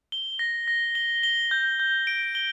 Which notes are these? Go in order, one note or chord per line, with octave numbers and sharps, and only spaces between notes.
G7
A#6
A#6
G7
G7
G6
G6
D7
G7